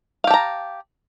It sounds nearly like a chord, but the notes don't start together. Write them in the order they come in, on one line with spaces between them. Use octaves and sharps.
F5 G4 A5 A#5